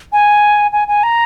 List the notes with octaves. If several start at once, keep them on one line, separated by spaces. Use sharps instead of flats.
G#5
G#5
G#5
A#5